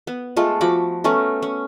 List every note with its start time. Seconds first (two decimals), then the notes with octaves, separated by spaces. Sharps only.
0.07 B3
0.36 G#3 A3 F4 A4
0.61 F3 F#4 B5 D6
1.04 A3 B3 C#4 A#4
1.42 C#4